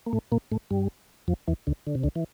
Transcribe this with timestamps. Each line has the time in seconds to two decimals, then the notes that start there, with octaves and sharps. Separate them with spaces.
0.06 A#3
0.13 A2 A3
0.32 A#2 A#3
0.52 A2 A3
0.71 G2 G3
1.28 F2 F3
1.48 E2 E3
1.67 D2 D3
1.87 D3
1.95 C3
2.03 D2 D3
2.16 E3